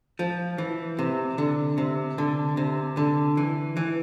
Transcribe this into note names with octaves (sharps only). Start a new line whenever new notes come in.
F3
E3
C3
D3
C3
D3
C3
D3
E3
E3